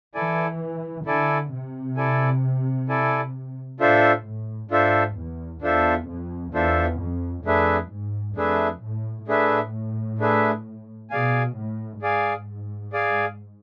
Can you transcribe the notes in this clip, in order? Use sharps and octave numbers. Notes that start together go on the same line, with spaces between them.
E3 E4 A4 D5 G#5
D3 E4 A4 D5 G#5
C3
E4 A4 D5 G#5
E4 A4 D5 G#5
A2 D4 F4 A4 C5 E5
A2
G#2 D4 F4 A4 C5 E5
E2
E2 D4 F4 A4 C5 E5
F2
E2 D4 F4 A4 C5 E5
F2
F2 A3 D4 G#4 B4 E5
G#2
F2 A3 D4 G#4 B4 E5
A2
A2 A3 D4 G#4 B4 E5
A3 D4 G#4 B4 E5
B2 G#4 D5 F5 G#5
A2
G#2 G#4 D5 F5 G#5
G#4 D5 F5 G#5